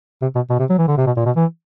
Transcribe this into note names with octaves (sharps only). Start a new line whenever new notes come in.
C3
B2
B2
C3
F#3
E3
D3
C3
B2
A#2
B2
E3